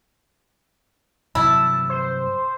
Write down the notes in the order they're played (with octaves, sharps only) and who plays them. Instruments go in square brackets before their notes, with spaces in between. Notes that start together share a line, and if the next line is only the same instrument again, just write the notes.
[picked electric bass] G2 C3 F#3 [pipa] E4 [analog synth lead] A5
[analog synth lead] C5